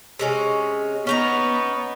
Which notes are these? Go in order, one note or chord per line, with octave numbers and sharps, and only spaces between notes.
C3 G#3 C#4
B3 C#4 D#4 A#5